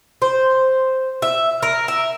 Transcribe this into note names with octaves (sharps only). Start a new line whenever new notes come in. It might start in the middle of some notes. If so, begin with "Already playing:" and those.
C5
E5
A#4
E5